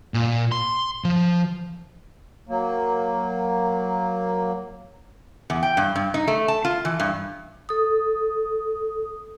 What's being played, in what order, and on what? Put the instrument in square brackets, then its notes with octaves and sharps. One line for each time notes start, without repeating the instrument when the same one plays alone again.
[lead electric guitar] A#2
C6
F3
[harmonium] F#3 A#3
[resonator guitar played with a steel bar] E2
G5
G2
G2
D#4
A3
A5
F4
E3
G2
[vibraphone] A4 D#6